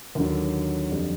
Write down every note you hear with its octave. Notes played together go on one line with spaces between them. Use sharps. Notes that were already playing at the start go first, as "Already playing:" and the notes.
D#2 D3 F#3
F2 D3 G3